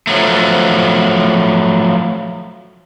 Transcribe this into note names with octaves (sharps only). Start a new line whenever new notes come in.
F3 F#3 A3